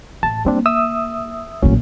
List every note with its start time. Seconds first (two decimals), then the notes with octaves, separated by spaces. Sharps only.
0.23 A1 A5
0.45 G3 A#3 C4 D4
0.66 E5 D#6 E6
1.62 A#1 A2 D3 F#3 C#4